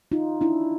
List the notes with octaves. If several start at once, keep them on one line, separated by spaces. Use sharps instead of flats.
D#4 F4
D4 E4